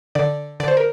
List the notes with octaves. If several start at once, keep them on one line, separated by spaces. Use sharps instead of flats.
D3 D5
D3 D5
C5
A#4